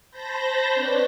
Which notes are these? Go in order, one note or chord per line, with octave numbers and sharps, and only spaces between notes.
C5 A5 B5 G6 A#6
C4 D4 B4 C#5